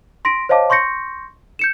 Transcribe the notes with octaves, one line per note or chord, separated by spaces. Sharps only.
C6 A#6 B6 D7
C5 C#5 D#5 F5 A5 D6
C6 C#6 G6 A#6 C#7
G6 C#7 E7